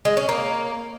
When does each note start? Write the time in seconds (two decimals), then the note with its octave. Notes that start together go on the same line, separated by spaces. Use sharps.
0.05 G#3
0.17 C#4
0.29 A#3